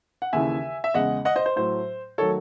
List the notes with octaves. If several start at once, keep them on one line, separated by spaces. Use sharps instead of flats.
F#5
D#2 C#3 E3 E5 G#5
E5
E2 C#3 G#3 D#5 F#5
D#5 F#5
C5 D#5
C5
A2 F#3 A3 C5
D#3 F#3 A3 A4 C#5